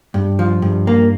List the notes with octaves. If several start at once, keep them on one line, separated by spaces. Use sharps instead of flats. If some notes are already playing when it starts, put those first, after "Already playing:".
G2
F3
G2
A#3